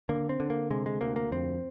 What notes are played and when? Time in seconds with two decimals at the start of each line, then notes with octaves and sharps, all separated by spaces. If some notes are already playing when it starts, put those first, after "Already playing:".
0.09 D3 A#3
0.29 C4
0.40 D3
0.50 A#3
0.70 C3 G#3
0.86 G#3
1.01 D2 A#3
1.16 A#3
1.32 F2 C4